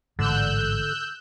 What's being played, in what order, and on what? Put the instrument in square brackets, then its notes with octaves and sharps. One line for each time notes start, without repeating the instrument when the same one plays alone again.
[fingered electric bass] A1 G#2 [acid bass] D3 [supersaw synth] E6 F#6 G6